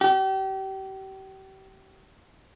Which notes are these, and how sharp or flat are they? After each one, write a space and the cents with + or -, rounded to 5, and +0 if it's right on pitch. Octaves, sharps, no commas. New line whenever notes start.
G4 -35